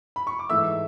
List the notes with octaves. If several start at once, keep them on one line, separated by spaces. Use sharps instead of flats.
B5
C#6
D6
G#2 E3 A3 E5 E6